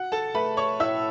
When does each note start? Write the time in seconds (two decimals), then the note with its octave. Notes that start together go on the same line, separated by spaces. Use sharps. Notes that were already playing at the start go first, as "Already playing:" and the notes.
Already playing: F#4 F#5
0.12 A4 A5
0.34 A3 B4 B5
0.57 C#5 C#6
0.80 A2 E5 E6